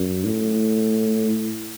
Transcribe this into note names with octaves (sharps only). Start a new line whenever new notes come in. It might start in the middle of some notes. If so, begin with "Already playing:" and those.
Already playing: F#2
A2